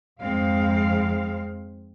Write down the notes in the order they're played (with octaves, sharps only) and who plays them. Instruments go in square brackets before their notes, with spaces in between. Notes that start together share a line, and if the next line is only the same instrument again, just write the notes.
[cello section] F2 G#2 G#3 C4 F5